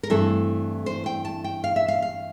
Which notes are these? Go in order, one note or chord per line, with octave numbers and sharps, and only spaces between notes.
A#4
G2 E3 A3 C4 E4 A4
C5
G5
A5
G5
F5
E5
F5
F5